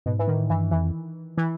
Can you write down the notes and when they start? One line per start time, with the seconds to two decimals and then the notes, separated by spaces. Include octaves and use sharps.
0.06 G#2 B2
0.19 E3
0.28 A2 D#3
0.50 G2 E3
0.71 F2 E3
1.38 E3